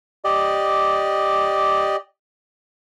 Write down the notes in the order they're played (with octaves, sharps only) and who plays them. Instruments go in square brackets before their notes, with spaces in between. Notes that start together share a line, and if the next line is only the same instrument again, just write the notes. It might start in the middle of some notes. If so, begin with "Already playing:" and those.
[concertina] G4 D5 D#5